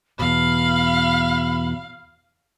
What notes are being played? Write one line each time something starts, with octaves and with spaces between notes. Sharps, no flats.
E2 B2 F5 B5